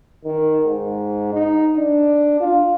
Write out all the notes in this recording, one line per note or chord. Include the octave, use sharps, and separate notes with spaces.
D#3
G#2
D#4
D4
F4